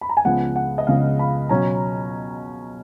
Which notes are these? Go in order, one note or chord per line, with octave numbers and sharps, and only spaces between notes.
B5
A#5
G#5
C#2 C#3 F3 B3 F#5
F#5
D#5
C#2 C#3 F3 B3 F5
B5
B2 F#3 C#4 A#5